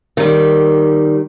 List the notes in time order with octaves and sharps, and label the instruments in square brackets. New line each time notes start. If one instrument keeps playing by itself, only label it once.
[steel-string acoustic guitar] D#3 G3